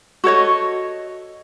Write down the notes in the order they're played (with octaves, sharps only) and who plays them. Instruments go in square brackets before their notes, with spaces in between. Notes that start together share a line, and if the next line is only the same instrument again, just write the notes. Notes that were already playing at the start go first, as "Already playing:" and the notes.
[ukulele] F#4 A4 C#5 D#5